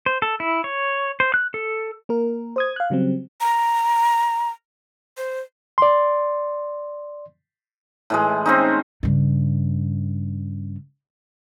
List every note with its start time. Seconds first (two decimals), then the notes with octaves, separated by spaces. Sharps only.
0.06 C5
0.22 A4
0.40 E4
0.64 C#5
1.20 C5
1.34 F#6
1.54 A4
2.09 A#3 A#4
2.56 C5 D#6 G#6
2.76 F5 F#6
2.90 C#3 F#3 G3 C4
3.41 A#5
5.17 C5
5.78 D5 C6
8.10 A2 E3 G#3
8.46 C4 C#4 D#4
9.03 G2 C#3